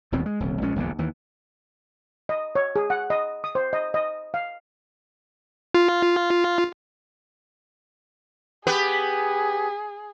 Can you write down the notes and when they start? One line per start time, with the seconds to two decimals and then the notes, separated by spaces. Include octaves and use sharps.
0.12 D#1 E2 B2 C4
0.26 G#3
0.40 D#1 C2
0.61 A#1 A#2 G#3 C#4
0.76 E1 A#1 D#2 D3
0.99 D#2 E3
2.29 D#5
2.55 C#5
2.76 G#4
2.90 F#5
3.10 D#5
3.44 D#6
3.55 C5
3.73 D#5
3.94 D#5
4.34 F5
5.74 F4
8.67 B3 G4 G#4 B4